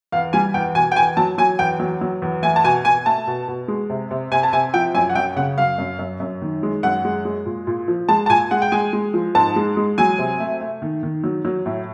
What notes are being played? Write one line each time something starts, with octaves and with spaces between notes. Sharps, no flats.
E2 F5
G3 G#5
E2 G5
B2 G#5
G5
E2 G#5
F#3 A5
F#3 G#5
E2 G5
F#3
F#3
E2
A3 G#5
A5
B2 G#5
B2 G#5
A3 A5
B2
B2
G#3
C3
C3
C3 G#5
A5
C3 G#5
F3 G5
F#2 G#5
F#5
F#2 G5
C#3 F#5
F#2 F5
F#2
F#2
F#2
D#3
G#3
F#2 F#5
G#3
G#3
A#2
A#2
F3
G#3 A5
A5
A#2 G#5
G#3 F#5
G5
G#3 G#5
G#3
F3
G#2 A5
G#3
G#3
F#3 G#5
C3
A3
A3
D#3
D#3
F#3
F#3
A2